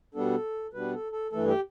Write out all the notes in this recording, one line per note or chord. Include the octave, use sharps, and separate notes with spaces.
B2 G3 B3 D4 A4
B2 G3 B3 D4 B4
A4
A4
G2 E3 A3 A4
G4